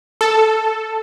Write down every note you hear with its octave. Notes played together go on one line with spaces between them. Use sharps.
A4